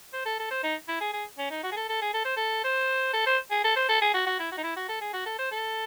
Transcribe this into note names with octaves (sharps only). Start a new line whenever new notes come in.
C5
A4
A4
C5
D#4
E4
G#4
G#4
C#4
D#4
F#4
G#4
A4
A4
G#4
A4
C5
A4
C5
A4
C5
G#4
A4
C5
A4
G#4
F#4
F#4
E4
F#4
D#4
E4
F#4
A4
G#4
F#4
A4
C5
A4